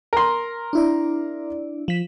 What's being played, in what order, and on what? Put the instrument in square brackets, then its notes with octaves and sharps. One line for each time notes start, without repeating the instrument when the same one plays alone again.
[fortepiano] A#4 C6
[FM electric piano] D4 E4 D5
F3 B6